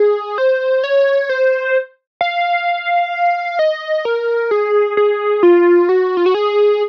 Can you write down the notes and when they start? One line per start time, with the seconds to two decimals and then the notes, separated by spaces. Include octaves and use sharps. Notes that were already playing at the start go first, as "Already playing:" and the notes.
Already playing: G#4
0.38 C5
0.84 C#5
1.29 C5
2.21 F5
3.59 D#5
4.05 A#4
4.51 G#4
4.97 G#4
5.43 F4
5.89 F#4
6.17 F4
6.26 F#4
6.34 G#4